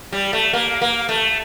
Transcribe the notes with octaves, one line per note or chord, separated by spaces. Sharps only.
G3
A3
A#3
A#3
A3